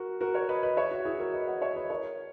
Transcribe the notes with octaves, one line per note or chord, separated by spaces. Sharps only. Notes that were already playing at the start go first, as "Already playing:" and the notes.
Already playing: F#4 A#4
F#4 A#4
A#4 C#5
B4 D#5
B4 D#5
C#5 E5
F#4
E4 G#4
F#4 A#4
B4 D#5
D#5 F#5
C#5 E5
B4 D#5
A#4 C#5